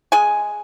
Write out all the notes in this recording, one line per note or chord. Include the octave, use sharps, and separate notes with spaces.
G#3 G#4 G#5